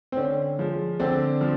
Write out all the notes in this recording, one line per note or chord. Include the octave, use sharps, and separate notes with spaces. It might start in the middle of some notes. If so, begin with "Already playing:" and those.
C4
D3 C#4
F3 G#3
D3 C4 D4
F3